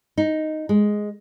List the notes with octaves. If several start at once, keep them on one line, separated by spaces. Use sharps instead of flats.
D#4
G#3